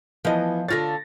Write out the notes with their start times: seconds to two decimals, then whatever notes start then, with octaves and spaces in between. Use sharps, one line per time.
0.25 E3 F3 B3 D#5
0.68 D3 F4 C#5 A6 A#6